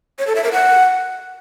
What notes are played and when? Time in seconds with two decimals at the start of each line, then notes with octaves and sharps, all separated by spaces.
0.19 C#5
0.27 A4
0.35 E5
0.44 A#4
0.52 F#5